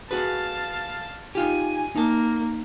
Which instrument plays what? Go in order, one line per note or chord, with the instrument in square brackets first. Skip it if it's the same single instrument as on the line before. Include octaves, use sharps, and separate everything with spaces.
[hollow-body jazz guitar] F#4 G#4 B4 [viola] F5 A5
[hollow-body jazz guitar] D#4 F4 G4 [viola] G#5
[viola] A#3 [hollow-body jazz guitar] D#4 A5